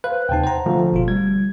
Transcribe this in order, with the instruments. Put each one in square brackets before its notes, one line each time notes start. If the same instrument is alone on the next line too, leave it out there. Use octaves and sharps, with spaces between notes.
[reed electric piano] B4 [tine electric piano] C5 F5 F#6
[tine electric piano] D#2 C3 D#4 [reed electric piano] G5 A5
[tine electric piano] C5 F#5 A#5
[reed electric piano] D3 F3 A3
[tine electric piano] G1 B2 F4
[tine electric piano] G3 [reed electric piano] G#6